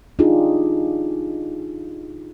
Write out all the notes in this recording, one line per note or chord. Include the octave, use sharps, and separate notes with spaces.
D4 D#4 F4 G4 G#4